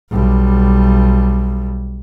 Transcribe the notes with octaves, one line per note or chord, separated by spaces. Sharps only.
B1 G3